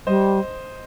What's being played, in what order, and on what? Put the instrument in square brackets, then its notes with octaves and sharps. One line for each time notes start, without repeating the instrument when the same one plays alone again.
[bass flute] G3 [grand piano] C5 D#5